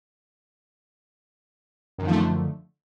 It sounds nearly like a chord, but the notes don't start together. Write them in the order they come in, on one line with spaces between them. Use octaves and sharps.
F#2 D#3 F3 A3 D3